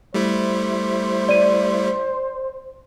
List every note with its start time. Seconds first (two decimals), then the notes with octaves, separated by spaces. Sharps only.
0.14 G3 A3 E4 C5
1.29 D5 D#7